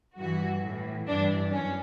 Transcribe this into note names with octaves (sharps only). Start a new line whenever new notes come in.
G2 E3 F#4
A2 E3
G2 E3 D4
F#2 C#4